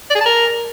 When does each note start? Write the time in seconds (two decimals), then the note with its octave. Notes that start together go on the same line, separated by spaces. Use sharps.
0.10 D5
0.15 G#4
0.20 A5
0.26 A#4